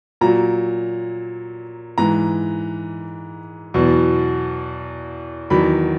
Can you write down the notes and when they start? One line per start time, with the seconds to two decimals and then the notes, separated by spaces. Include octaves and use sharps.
0.21 A#2 F#3 A#5
1.98 G#2 E3 A#5
3.74 E2 B2 F#3
5.50 E2 D#3 F#3 B5